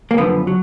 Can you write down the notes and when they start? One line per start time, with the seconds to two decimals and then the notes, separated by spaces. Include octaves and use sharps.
0.11 A#3
0.18 F#2 D3 F3 B3
0.47 F#3